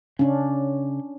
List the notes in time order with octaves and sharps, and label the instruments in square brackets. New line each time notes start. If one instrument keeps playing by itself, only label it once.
[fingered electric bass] C#3 [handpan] C#4 D4